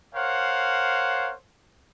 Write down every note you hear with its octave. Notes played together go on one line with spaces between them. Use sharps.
A#4 C5 C#5 F5 F#5